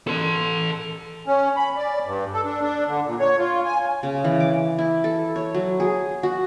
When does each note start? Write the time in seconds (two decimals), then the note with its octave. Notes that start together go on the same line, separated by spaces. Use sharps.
0.07 A4 C6
1.27 C#4
1.57 B5
1.77 D5
2.05 G2
2.33 A4
2.45 D4
2.61 D4
2.88 D3
3.07 A#2
3.20 C#5
3.38 F4
3.65 G#5
4.03 C#3
4.24 E3
4.40 D6
4.78 E4
5.04 A4
5.36 C#5
5.55 F#3
5.80 G#4
6.23 F#4